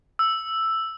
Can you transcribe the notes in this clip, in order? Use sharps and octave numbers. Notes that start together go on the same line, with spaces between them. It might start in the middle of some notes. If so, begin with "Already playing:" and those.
E6